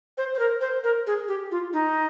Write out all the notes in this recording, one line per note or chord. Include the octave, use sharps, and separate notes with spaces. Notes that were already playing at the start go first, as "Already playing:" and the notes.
C5
C5
A#4
C5
A#4
G#4
G4
F4
D#4